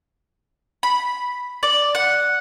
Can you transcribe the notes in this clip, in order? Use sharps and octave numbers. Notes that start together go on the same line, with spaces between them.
B5
D5
F#5